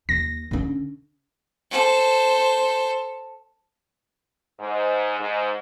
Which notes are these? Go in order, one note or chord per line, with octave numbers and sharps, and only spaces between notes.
D#2 A#6
D3 C#4
A4 C5
G#2
G#2